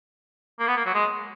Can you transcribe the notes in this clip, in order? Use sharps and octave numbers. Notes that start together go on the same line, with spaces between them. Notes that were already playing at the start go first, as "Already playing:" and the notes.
A#3
B3
A#3
F#3
G#3